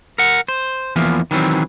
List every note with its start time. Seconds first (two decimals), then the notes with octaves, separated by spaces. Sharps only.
0.18 A#4 F#5
0.48 C5
0.96 E2 E3 F3 A#3
1.31 D#3 E3 F#3 C4